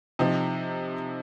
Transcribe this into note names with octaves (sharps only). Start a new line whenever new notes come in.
C3 F3 C4 D#4